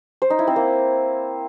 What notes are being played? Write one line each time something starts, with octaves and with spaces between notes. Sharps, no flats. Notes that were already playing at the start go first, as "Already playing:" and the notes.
C5
D#4
E4
C4
A#3